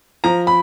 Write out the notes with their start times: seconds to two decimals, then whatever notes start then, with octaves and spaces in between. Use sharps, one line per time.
0.24 F3 A#5
0.47 B5